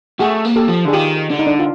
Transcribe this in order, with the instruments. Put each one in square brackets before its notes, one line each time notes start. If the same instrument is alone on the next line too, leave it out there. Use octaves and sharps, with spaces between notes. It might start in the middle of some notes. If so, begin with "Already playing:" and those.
[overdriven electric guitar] A3 [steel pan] F#4 G#4
[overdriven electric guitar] A#3
[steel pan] G4 A4
[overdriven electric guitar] F3
[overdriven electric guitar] D3 [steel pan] G#4
[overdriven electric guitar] D#3 [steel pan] F4 G4
[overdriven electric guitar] D3 [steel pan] D4
[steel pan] D#4
D4
F4